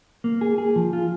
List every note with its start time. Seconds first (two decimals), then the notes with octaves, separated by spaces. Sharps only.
0.24 A#3
0.41 G#4
0.58 G#4
0.76 F3
0.93 F4